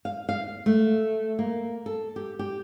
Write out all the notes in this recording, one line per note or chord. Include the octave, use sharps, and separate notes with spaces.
F5
F5
A3
A#3
A4
G4
G4